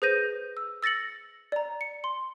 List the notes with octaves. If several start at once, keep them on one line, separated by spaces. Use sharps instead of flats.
G#4 B4 C5 G6 A#6 D#7
E6
E6 A6 A#6 C#7 F#7
D5 A#5
C#7
C6